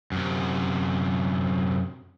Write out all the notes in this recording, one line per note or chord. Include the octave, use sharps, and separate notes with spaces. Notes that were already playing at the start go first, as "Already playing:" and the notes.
F#2 C3